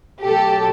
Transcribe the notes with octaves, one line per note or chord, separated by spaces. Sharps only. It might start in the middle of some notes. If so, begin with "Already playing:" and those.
B2 F#3 A3 G4 A4